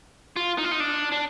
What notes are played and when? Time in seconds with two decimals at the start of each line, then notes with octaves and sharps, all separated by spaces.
0.36 F4
0.58 D#4
0.64 F4
0.71 D#4
0.80 D4
1.12 D4